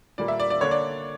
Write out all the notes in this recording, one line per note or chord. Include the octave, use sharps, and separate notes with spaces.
A#2 G3 A#3 D5
E5
D5
D5
D3 A#3 D4 C#5
D5